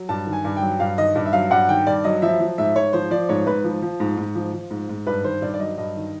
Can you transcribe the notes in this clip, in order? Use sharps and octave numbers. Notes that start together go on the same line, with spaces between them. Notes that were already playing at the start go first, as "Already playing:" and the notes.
Already playing: F#3
G2 A5
D#3
G#5
G2
G5
F#3
G2 F5
D#3 D#5
G2
E5
F#3 F5
G2 F#5
D#3 G5
G2 D5
F#3 D#5
F3 E5
F3
G#2 E5
G#2 C#5
F3 C5
F3 D5
G#2 C#5
G#2 B4
F3
F3
G#2
G#2
F3
F3
G#2
G#2
G2 B4
D#3 C5
G2 D5
D5
F#3 D#5
G2 D#5
D#3